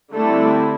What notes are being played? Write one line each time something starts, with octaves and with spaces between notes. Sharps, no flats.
D3 G3 A3 C4 E4 A4